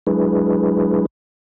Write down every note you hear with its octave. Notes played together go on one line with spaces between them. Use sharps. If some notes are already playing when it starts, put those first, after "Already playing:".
F#3 G#3 D4 E4 G#4 B4